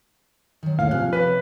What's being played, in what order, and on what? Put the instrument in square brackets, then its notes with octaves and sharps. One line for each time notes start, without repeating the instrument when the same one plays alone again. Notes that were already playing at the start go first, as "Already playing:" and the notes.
[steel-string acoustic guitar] D#3 F#3
[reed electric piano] D#2 A2 [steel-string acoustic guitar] G#4 C#5 [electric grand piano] F5
[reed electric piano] C3 F3 F#6 [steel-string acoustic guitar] C#4
[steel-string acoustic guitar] G4 C#5 E5 [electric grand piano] B4